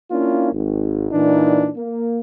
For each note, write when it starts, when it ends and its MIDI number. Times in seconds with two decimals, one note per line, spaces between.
0.11 0.50 58
0.11 0.50 61
0.11 0.50 62
0.11 0.50 64
0.11 0.50 65
0.52 1.08 32
1.11 1.69 46
1.11 1.69 52
1.11 1.69 62
1.11 1.69 63
1.76 2.20 58